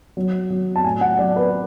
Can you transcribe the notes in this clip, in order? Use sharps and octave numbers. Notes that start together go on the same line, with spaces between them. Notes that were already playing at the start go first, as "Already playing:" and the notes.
F#3
F#3
A5
A2 G#5
F#5
F#3 D5
B4